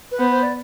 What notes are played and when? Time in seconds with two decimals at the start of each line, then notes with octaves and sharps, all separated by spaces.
0.11 B4
0.19 B3 C5
0.30 C5
0.42 D5